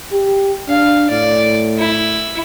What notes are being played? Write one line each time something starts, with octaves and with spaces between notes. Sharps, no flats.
G4
D4 F5
A2 D5
E4